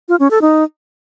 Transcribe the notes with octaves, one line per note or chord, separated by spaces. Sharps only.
F4
C#4
A4
D#4